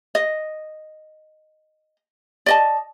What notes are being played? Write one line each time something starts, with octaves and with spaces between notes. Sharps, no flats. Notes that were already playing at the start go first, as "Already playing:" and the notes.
D#5
D5 D#5 A5